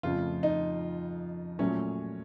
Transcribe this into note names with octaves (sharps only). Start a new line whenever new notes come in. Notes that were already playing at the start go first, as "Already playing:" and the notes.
F2 C#3 F3 A3 F4
D#4
A#2 F#3 A3 C#4